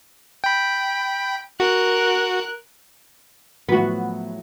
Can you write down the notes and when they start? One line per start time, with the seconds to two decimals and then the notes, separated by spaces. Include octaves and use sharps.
0.44 G5 B5
1.60 F#4 A#4 F#6
3.69 A2 F3 F#3 B3 F#4